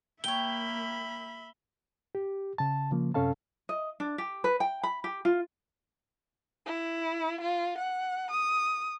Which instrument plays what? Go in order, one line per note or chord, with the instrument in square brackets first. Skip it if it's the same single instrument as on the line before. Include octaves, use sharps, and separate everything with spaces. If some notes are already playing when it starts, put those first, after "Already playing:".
[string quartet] A#3 [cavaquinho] C#5 G5 [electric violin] E5 B5 [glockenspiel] G7
[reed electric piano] G4
C#3 A5
C#3 F3 A#3
F#2 C3 C#4 A4 F5 A5
[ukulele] D#5
D4
G4
B4
G5
B5
G4
F4
[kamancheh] E4
F4
F#5
D#6